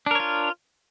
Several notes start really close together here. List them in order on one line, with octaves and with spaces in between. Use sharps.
D4 A#4 C#5 F4